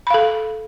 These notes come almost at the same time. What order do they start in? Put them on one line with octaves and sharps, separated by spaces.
B5 F5 A4